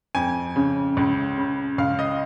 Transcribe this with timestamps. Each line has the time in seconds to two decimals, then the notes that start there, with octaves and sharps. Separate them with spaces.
0.15 F2 G#5
0.56 C#3
0.97 C#2
1.37 C#3
1.78 C#2 F5
1.99 D#5